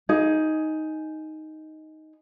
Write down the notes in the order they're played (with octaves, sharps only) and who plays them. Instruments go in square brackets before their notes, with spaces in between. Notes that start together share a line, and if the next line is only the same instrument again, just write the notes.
[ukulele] D#4 G#4